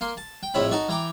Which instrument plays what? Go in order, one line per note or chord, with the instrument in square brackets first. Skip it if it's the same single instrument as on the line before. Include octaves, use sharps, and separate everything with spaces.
[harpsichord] A#3 C6
A5
G5
A#1 F2 A2 E4 C#5 B5
D#4 F#4 A5 C#6
E3 G5 A#5 D6